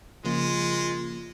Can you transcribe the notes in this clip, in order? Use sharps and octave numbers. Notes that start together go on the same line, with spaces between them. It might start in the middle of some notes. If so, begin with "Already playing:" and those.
C#3 F3 G#3 A#3 F4